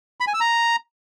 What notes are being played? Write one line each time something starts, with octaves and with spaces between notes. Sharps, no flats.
B5
G#5
E6
A#5